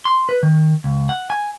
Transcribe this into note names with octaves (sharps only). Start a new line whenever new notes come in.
C6
B4
D#3
C#2
F#5
G#5